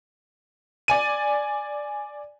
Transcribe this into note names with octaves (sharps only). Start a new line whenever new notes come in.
D5 G#5 D#7